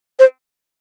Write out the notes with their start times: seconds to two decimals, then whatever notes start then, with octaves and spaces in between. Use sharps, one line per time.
0.19 C5